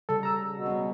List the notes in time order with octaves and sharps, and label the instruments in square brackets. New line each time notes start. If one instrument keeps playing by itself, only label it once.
[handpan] C#3 G3 [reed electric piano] A4
[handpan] G4 [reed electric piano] A#5 E6
[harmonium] B2
[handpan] G3 C#4